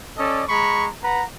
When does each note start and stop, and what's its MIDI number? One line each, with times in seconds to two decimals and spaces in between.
0.18 0.43 61
0.18 0.43 69
0.18 0.43 74
0.18 0.43 75
0.48 0.88 56
0.48 0.88 82
0.48 0.88 83
0.48 0.88 85
1.03 1.24 71
1.03 1.24 78
1.03 1.24 82